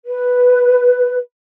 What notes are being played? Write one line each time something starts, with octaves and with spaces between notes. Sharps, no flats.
B4